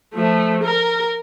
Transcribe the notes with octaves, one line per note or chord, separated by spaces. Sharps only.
F3 A3
A#4